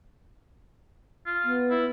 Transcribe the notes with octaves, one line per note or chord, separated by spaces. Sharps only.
F4
B3
E4